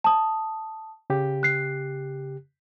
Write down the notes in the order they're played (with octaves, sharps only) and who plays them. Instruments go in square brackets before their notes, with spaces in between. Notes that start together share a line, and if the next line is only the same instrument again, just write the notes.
[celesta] A5 D#6
[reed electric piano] C#3 G4
[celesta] F#6 C7